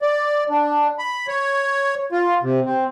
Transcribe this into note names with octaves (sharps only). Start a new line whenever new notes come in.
D5
D4
B5
C#5
F4
C3
C4